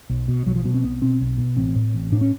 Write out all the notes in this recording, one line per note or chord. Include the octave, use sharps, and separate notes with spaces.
B1
B2
B1 F#3
F3
B2 F#3
C4
B1 B3
B2 C4
B1
B2
A1 C4
A2
A1
A2 D4
C#4